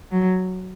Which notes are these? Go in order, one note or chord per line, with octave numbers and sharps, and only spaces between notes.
F#3